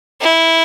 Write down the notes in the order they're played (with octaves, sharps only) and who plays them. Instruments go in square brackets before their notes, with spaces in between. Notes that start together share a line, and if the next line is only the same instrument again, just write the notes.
[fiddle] E4